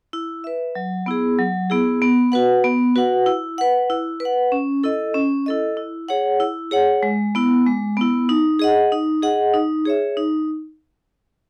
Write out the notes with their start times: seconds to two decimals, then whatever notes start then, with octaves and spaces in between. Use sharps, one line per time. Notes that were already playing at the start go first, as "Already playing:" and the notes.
0.13 E4
0.44 B4 E5
0.75 F#3
1.06 B3 E4 G#4
1.38 F#3
1.70 B3 E4 G#4
2.02 B3
2.32 F#4 B4 F#5
2.64 B3
2.96 F#4 B4 F#5
3.26 E4
3.58 B4 F#5
3.90 E4
4.20 B4
4.25 F#5
4.52 C#4
4.84 E4 A4 D#5
5.14 C#4
5.46 E4 A4 D#5
5.77 E4
6.09 G#4 C#5 F#5
6.40 E4
6.71 G#4 C#5 F#5
7.03 G#3
7.35 B3 E4
7.66 G#3
7.97 B3 E4
8.29 D#4
8.59 G#4 D#5 F#5
8.92 D#4
9.22 G#4 D#5 F#5
9.54 D#4
9.85 G#4 C#5 E5
10.17 D#4